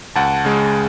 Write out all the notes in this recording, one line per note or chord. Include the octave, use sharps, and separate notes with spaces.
C#2 F#5 A5
C#3 G#3